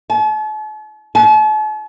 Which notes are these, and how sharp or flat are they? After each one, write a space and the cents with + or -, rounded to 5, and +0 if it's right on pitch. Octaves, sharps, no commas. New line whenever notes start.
A5 -45
A5 -45